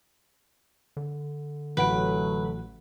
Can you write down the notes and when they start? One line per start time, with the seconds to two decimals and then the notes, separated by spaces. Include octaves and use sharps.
0.97 D3
1.77 A1 F#3 A3 B4 F#5 D7